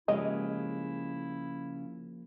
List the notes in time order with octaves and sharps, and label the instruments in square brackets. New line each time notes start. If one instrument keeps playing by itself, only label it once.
[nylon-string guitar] C#3 G#3 G4 [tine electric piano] F3 A#3 [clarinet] E4 [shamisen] D#5